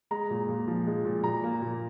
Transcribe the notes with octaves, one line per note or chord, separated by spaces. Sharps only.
G#3 A#5
A#2
A#2
F3
G#3
A#2
A#2 A#5
A#3
A#2